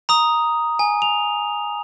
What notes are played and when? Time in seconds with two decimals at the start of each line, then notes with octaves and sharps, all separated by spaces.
0.09 A#5 D#6
0.79 G#5
1.02 F7